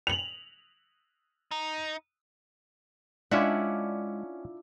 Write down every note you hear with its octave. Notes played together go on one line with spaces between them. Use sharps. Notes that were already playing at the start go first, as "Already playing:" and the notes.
F7 F#7
D#4
G#3 C#4 D4 E4 F4 D5 E5 F#5